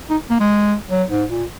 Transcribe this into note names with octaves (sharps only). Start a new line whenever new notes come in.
D#4
A#3
G#3
F#3
G#2
A#2